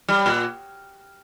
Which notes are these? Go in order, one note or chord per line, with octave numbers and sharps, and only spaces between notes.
G3
A#2